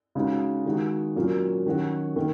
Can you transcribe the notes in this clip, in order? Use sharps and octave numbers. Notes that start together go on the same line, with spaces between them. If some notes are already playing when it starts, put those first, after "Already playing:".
C#3 G#3 D#4 F#4
D#3 G#3 D#4 F#4
A#2 F#3 A#3 C#4
D#3 F#3 C#4 F#4
D#3 A#3 D#4